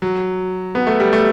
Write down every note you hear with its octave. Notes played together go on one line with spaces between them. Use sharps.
F#3
B3
A3
G3
A3